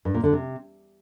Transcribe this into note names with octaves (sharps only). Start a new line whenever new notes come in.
G2
A#2
D3
C3